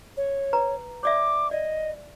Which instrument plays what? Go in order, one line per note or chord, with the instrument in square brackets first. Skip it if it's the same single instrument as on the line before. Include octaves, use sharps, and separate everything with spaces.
[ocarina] C#5
[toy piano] B4 A#5
[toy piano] C#5 D5 E5 [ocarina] D6
[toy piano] D5 [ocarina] D#5